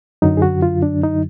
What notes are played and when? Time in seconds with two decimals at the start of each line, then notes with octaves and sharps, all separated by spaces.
0.22 F#2 D3 F#3 D#4
0.37 G#4
0.42 F#4
0.62 F4
0.82 D4
1.03 D#4